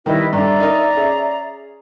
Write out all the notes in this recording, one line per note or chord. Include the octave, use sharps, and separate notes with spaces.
D#3 G3 E4 B4 D#5
G2 D3 D5 E5 A#5
D#4 A#4 D#5
C#4 G#4